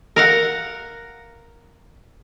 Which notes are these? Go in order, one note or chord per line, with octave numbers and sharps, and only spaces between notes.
A#4 F5 F#5